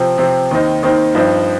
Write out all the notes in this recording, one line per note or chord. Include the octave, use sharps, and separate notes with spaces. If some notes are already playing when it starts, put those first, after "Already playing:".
Already playing: C3 F3 C4
C3 F3 C4
D#2 D#3 C4 D#4
D#2 D#3 C4 D#4
G2 F3 C4 D#4